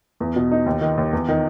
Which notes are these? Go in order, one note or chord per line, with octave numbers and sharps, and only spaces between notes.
E2
B2
D#4
D#2
D#3
D#2
E2
D#3